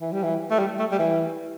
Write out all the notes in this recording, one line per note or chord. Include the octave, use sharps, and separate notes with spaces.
E3
G3
E3
A3
G3
A3
G3
E3